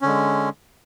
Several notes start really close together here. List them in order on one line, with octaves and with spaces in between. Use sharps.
C#4 D3 G#3